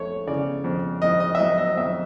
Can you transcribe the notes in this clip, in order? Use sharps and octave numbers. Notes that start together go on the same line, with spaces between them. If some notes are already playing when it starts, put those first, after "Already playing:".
Already playing: F2 A3 C#5
C#3 D5
F2
F2 D#5
D#5
E5
F#3 D#5
D#5
F2 E5